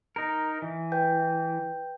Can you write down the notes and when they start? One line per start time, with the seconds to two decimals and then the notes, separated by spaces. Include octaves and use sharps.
0.16 D#4 A#4
0.62 E3
0.92 B4 G5 G6